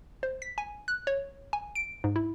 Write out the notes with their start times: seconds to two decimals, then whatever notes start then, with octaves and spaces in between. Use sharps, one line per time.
0.23 C5
0.42 B6
0.58 G#5
0.88 F#6
1.07 C#5
1.53 G#5
1.75 D7
2.04 G#2
2.16 E4